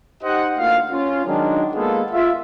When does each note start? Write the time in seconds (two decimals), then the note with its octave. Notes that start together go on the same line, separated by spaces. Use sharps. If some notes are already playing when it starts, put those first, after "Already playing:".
0.23 D#4 G4 C5 D#5 F#5
0.58 D2 A#3 F4 F5
0.91 C#4 F4
1.26 D#3 F#3 G#3 D4
1.74 G#3 A#3 B3 F4 G#4 A4
2.11 F4 E5